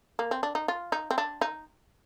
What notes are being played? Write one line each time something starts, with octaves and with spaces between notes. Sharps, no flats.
A#3
C4
D4
D#4
F4
D#4
C4
D4
D#4